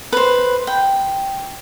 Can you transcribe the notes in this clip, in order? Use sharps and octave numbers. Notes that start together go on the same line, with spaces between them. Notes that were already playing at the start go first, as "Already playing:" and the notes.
B4 C5
G5